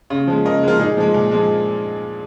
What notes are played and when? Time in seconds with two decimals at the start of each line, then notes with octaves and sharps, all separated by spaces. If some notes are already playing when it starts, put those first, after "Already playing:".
0.10 C#3
0.27 F3 G#3
0.45 C#3 A#4 D#5
0.63 F3 G#3 F4 A#4
0.79 A#2 D#4 G#4
0.97 F3 G#3
1.14 A#2
1.31 F3 G#3